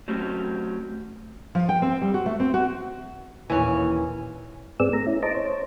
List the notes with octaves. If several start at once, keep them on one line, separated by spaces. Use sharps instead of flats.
F#3 A3 C4 C#4 G4
F3
G5
C4
G3
F#4
A3
C4
F#4
D#2 A#2 E3 C#4
G#2 B3 C4 G#4 D5 E6
A3 A#5
C#4 E4
C5 D#5 A5 A#5 D6
C5 C#5